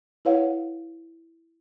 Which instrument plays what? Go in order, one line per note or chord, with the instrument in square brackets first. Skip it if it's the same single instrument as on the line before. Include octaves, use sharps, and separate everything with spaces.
[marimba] E4 B4 C#5 F5 F#5